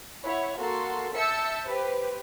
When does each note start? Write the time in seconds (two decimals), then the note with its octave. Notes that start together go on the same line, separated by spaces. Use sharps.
0.22 E4 C#5 F#5
0.57 A#3 F#4 A4 C6
1.15 E5 A5 E6 G6 C#7
1.65 G4 B4 C5